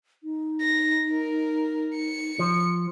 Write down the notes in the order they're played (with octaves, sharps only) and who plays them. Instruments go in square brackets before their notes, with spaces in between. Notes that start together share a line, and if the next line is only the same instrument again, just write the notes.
[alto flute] D#4
[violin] A#6
A#4
C#7
[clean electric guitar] F3